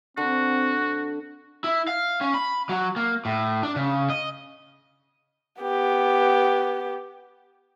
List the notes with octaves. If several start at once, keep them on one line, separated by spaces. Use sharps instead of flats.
D3 C4 F#4
E4
F5
C#4
B5
F#3
A#3
A2
D4
C#3
D#5
B3 G4